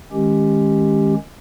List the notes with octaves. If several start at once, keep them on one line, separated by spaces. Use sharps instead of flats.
D#3 G#3 C#4 G4